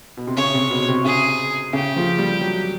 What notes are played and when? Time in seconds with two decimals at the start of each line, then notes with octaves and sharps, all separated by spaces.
0.17 B2
0.27 C3
0.37 C#3 C#5
0.54 C3
0.71 B2
0.89 C3
1.05 C#3 G#4
1.73 C#3 G4
1.96 F3
2.19 G3
2.41 F#3